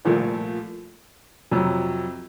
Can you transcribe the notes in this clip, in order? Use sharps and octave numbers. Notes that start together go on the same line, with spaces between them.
C2 A#2 F3 A3
F2 C3 F#3